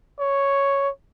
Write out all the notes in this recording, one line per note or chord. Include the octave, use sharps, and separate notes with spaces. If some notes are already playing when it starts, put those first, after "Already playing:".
C#5